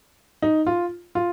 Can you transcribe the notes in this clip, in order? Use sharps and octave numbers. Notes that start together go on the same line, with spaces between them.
D#4
F4
F4